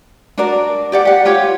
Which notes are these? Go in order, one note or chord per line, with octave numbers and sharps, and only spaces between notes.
D4 F#4 A#4 D5
G4 D5 F#5
G4 F#5
F4 G4 C#5